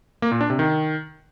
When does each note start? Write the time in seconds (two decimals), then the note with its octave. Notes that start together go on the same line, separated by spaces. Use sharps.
0.22 A#3
0.31 A#2
0.41 D4
0.50 C3
0.59 D#3